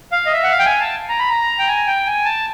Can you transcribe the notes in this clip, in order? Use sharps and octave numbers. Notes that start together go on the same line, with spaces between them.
F5
D#5
E5
F#5
F5
G5
G#5
A5
A#5
B5
A#5
G5
G#5
G5
G#5
A5